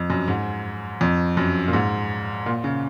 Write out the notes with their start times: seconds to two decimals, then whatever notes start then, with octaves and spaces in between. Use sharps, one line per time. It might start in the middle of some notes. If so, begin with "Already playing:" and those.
Already playing: F2
0.10 F#2
0.28 G#2
1.01 F2
1.37 F#2
1.68 A#2
1.73 G#2
2.46 A#2
2.64 C#3